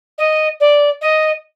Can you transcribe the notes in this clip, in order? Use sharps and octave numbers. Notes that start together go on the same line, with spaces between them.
D#5
D5
D#5